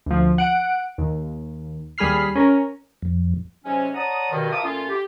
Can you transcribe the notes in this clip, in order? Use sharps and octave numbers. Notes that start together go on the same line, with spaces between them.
D2 F3
F#5 D7
D#2
D#2 G3 G#4 B5 F6 C7
C#4 A#4
F2
G#2 C3 F#3 C#4
C#5 D5 F#5 A5 A#5 D#6
G2 B2 D#3
F4 A#4 E5 A5 D6 D#6
A#2 A3 C#4 F4
G4